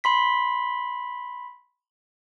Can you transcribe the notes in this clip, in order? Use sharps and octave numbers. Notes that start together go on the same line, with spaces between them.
B5 C6 B6